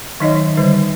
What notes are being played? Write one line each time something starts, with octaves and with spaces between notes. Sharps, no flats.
D#3 F#3 D#4 C#5 D#5
D3 G3 C5